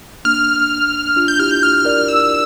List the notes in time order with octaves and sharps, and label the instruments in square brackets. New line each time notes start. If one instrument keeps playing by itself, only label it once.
[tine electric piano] A#3 D4 [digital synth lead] F6
[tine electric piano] D4 F4
[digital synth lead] G6
[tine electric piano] E4 G4 [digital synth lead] F6
[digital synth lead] G6
F6
[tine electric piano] A#4 D5
[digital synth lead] E6